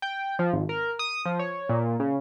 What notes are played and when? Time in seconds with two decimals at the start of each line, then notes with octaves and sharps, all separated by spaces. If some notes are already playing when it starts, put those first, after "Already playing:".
0.02 G5
0.39 F3
0.53 G#1
0.69 A#4
0.99 D#6
1.26 F3
1.39 C#5
1.69 A#2
2.00 C#3